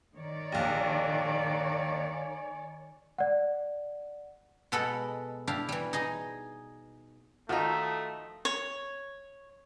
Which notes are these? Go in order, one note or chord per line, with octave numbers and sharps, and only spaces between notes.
D#3 C#5 D5
A#1 D#2 E5 F5 A5
G#5
D5 F#5
B2 G#3 A4 B4 F#5 B5
D4 E4 G4 F5
E3 G3
D#4 G#4 D#5
D#3 F3 A3 D#4 F4 F#4
C#5